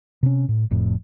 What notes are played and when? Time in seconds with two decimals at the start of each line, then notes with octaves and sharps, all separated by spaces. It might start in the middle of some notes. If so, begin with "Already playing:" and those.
0.23 C3 C#4
0.48 A2
0.71 F1 F2 A2